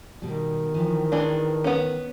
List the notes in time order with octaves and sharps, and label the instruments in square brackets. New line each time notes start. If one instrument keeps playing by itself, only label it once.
[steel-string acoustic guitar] B2 G3 [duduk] D#3
[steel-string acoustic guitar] E3 F3
[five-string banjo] E3 D4 [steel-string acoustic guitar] G#3
[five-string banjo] B3 C#4